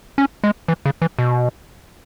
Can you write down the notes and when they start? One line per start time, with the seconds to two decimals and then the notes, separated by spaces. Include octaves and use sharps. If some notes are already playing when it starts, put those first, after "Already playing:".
0.18 C#4
0.44 G#3
0.68 E3
0.86 C#3
1.02 E3
1.19 B2